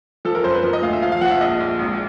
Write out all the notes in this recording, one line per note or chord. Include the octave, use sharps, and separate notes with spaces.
F3 A4
A#4
F#2 C5
B4
F3 A#4
D#5
D2 F5
E5
F3 F5
F5
F3 F#5
E5
A#1 D#5
A#1
G#1